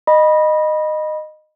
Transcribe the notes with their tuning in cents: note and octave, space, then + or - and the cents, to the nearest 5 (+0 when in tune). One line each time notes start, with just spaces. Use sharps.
D#5 -15 B5 -20